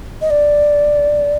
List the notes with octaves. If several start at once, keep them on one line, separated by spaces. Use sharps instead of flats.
D#5
D5